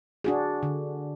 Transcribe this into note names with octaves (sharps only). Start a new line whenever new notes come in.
D4 F#4 G#4
D3